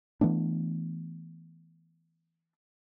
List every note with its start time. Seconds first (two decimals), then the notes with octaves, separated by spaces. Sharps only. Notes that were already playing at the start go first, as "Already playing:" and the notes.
0.21 E3 A3 B3 D4